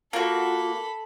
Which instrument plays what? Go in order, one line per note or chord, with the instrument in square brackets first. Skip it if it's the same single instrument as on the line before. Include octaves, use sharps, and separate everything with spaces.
[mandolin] A#3 F#4 [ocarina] F4 [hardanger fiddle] A4 B5